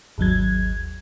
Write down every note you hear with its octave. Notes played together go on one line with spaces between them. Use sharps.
G#1 D#2 F#3 G#6